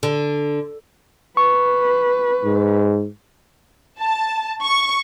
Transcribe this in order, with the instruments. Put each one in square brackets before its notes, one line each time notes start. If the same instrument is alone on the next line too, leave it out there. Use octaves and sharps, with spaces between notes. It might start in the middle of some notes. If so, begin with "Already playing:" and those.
[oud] D3
[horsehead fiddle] B4 [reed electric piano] C#6
[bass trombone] G#2
[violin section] A5
C#6